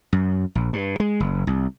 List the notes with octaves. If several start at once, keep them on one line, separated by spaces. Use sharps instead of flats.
F#2
A#1
G2
G#3
F#1
C2